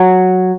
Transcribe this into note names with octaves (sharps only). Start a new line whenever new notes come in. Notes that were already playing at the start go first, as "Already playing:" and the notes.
Already playing: F#3